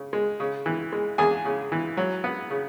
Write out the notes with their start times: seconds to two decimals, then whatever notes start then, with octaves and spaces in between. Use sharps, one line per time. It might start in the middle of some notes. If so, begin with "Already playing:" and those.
Already playing: C#3
0.13 G#3
0.40 C#3
0.66 E3
0.92 G#3
1.18 E2 G#4 G#5
1.45 C#3
1.72 E3
1.97 F#3
2.24 B3
2.50 C#3